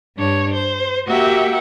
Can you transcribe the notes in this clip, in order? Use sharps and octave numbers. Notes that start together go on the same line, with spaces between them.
G2 D4 C#5
C5
A#3 F#4 G4 E5 F#5 G5